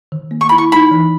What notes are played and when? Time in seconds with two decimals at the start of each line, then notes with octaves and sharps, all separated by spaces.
0.12 D#3
0.31 A#3
0.41 C#6
0.49 E4 B5
0.58 C#6
0.72 D#4 B5
0.91 E3